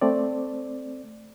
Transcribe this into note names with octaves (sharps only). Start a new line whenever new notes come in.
A3 C4 D5